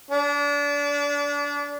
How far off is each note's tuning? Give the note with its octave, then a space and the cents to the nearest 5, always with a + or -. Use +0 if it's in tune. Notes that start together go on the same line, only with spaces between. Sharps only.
D4 -30